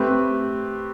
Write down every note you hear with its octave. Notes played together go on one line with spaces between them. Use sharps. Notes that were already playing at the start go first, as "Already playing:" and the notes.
Already playing: A3 C4 G4 B4